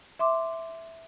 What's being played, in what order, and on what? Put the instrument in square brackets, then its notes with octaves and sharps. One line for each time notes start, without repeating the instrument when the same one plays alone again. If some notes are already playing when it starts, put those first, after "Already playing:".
[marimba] E5 C6 D6